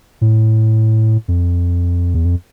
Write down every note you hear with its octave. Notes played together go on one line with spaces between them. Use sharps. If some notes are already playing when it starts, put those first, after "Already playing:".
A2
F2
E2
F2